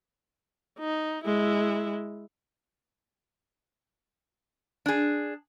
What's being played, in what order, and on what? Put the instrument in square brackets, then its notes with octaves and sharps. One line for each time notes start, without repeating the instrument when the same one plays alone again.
[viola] D#4
G#3 E4
[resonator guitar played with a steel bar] D4 G#4